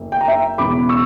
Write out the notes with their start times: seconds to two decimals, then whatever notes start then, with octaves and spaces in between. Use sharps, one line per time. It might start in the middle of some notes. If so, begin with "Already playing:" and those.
Already playing: F#1
0.12 G5
0.21 A#5
0.28 E5 G5
0.58 E1 E2 C#3 E3 B5 D6
0.89 C#6 E6